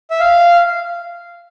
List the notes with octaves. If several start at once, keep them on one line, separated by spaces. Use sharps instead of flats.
E5
F5